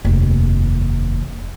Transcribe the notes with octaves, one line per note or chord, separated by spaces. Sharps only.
F1 D#2